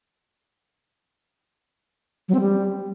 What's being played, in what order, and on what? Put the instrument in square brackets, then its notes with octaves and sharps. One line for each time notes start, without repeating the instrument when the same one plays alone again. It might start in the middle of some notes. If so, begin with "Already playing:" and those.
[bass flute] F#3
C4
G3